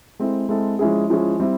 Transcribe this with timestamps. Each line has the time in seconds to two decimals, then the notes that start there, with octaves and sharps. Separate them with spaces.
0.19 G#3 C4 E4 A4
0.49 G#3 C4 E4 A4
0.79 F3 G#3 C#4 E4 G#4
1.10 F3 G#3 C#4 E4 G#4
1.40 G3 C4 E4